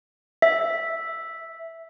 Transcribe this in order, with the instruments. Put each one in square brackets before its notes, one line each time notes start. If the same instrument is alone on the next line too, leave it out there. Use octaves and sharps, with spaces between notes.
[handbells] E5